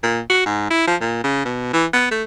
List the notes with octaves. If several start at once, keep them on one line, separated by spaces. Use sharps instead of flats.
A#2
F#4
G#2
E4
F3
A#2
C#3
B2
E3
B3
A3